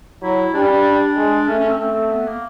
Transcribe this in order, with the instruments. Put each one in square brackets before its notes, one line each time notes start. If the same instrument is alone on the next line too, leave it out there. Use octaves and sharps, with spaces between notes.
[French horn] F#3 [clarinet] E4
[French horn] G3 [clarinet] D4
[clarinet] C#4
D4
[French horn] G#3
[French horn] A3 [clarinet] C#4
[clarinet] C#4
C4
[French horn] A3 [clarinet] C4
[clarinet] B3
A#3